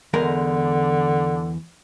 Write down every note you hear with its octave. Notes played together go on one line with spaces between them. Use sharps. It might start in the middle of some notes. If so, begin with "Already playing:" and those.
E2 D3 G#3 A#4